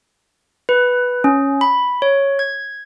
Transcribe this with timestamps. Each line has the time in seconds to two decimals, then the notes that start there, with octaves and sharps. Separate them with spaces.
0.69 B4
1.24 C#4
1.61 B5
2.02 C#5
2.39 G#6